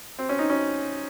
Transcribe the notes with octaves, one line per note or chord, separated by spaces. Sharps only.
C4
C#4
D#4
C#4